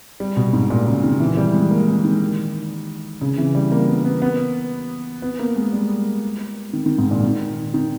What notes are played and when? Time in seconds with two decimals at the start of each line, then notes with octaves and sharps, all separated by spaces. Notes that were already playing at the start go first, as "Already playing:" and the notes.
0.20 G3
0.37 B2
0.53 G#2
0.70 A#2
0.87 C#3
1.04 D#3
1.20 E3
1.37 G3
1.54 G#3
1.71 A#3
1.88 G#3
2.04 D#3
3.21 C#3
3.38 E3
3.55 G3
3.72 A#3
3.88 B3
4.05 B3
4.22 B3
5.22 B3
5.39 A#3
5.56 G#3
5.73 G3
6.73 D#3
6.86 D#3
6.98 G#2
7.11 A#2
7.23 D#3
7.74 D#3